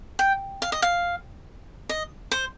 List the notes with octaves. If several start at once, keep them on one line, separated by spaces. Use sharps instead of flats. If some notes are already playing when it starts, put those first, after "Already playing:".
G5
F5
D#5
F5
D#5
C5